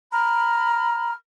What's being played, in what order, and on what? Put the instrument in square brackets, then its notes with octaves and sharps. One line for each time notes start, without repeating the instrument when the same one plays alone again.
[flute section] A#5 B5 F6